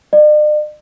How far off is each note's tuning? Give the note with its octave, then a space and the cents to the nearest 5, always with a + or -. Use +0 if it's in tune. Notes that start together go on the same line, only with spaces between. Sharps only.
D5 +45